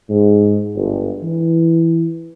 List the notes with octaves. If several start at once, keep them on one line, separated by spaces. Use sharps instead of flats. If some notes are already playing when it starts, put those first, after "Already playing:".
G#2
G1
E3